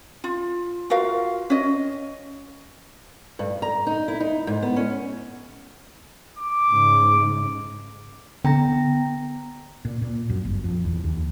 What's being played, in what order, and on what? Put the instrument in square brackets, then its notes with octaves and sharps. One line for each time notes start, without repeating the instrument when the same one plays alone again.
[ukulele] F4
F4 F#4 A#4 F5
C#4 D#5
[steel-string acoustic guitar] G2
A#5
D#4
E4
D#4
G#2
B3
C#4
[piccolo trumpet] D6
[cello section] G#2 C#3
[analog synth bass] D3 [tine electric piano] B3 [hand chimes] G5 A#5 A#6
[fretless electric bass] A#2
A#2
F#2
G1
F2
E2
D#2